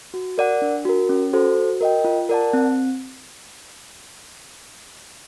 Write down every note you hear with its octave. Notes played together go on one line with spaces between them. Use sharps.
F#4
A#4 D5 F#5
D4
F#4 A#4
C#4
F#4 A4 C5
F#4
A#4 D#5 G5
F4
A#4 D5 F#5 A5
C4